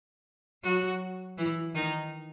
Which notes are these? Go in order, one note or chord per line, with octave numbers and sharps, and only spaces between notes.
F#3 F#4
E3 E4
D#3 D#4